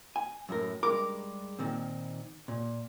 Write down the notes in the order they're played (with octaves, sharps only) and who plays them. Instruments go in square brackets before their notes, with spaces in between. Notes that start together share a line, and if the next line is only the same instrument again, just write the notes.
[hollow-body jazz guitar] G#5
F#2 A2 A#4
[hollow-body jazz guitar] G2 G#3 A#4 [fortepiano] D6
[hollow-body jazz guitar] A#2 D#3 C4
A#2